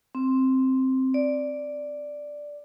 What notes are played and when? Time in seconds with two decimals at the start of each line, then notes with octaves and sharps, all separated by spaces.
0.15 C4
1.14 D5